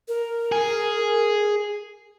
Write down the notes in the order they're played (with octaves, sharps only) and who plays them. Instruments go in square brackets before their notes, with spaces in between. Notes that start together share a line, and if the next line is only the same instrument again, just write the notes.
[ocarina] A#4
[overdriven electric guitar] G#4